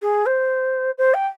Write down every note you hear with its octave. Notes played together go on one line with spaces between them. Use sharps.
G#4
C5
C5
G5